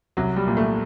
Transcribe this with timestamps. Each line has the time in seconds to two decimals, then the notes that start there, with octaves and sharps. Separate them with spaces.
0.17 C2 F#3
0.36 G3
0.47 A#2
0.57 A3